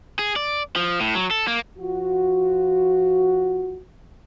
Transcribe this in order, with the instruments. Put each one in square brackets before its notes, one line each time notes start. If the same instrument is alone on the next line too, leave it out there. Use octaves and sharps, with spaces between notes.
[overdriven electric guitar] G#4
D5
F3
A2
F#3
A4
A#3
[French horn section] F3 F4 F#4